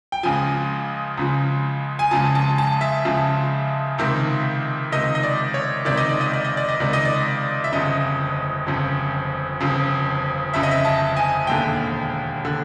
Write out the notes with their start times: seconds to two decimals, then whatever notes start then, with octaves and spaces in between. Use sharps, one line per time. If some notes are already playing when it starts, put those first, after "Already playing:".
0.12 G5
0.23 C#2 C#3 F3 G#5
1.17 C#2 C#3 F3
1.99 G#5
2.11 C#2 C#3 F3 A5
2.35 A5
2.58 A5
2.81 E5
3.05 C#2 C#3 F3
3.98 C#2 C3 D#3
4.92 C#2 C3 D#3 D#5
5.15 D#5
5.23 D5
5.54 C#5
5.85 C#2 C3 D#3 D5
5.97 D#5
6.09 D5
6.21 D#5
6.34 D5
6.45 D#5
6.57 D5
6.69 D#5
6.80 C#2 C3 D#3 D5
6.93 D#5
7.05 D5
7.64 E5
7.72 G1 F2 C#3 D#5
8.66 G1 F2 C#3
9.60 G1 F2 C#3
10.54 G1 F2 C#3 E5
10.63 D#5
10.71 E5
10.85 A5
11.17 G#5
11.47 E1 D#2 D3 G5
12.45 D3